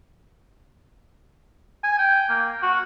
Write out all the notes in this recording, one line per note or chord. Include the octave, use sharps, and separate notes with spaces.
G#5
G5
A#3
F#4